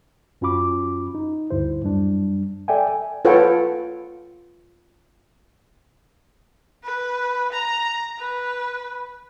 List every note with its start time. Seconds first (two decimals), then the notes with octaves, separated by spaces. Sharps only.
0.41 F#2 C#4 F4 F#4 B5 D6
1.15 D#4
1.51 D2 G2 E4 C5
1.83 F#2 G3 D4
2.68 A4 D5 E5 G5 G#5
3.25 F4 A4 B4 C#5 F#5 G5
6.84 B4
7.53 A#5
8.19 B4